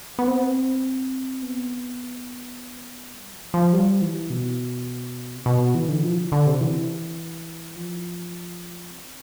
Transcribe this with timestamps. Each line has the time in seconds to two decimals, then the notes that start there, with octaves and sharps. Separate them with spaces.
0.19 B3
0.28 C4
1.42 B3
3.15 G3
3.34 F3
3.54 F3
3.73 G3
4.01 E3
4.30 B2
5.36 C3
5.46 B2
5.75 E3
5.88 D3
5.96 E3
6.03 F3
6.32 D3
6.46 C3
6.61 E3
7.76 F3
8.91 C4